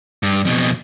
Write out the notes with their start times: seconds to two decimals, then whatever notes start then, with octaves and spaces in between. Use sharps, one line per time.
0.23 G2
0.45 F2 B2